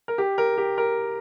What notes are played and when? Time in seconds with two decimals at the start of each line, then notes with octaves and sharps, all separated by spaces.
0.08 A#4
0.18 G4
0.38 A#4
0.58 G4
0.78 A#4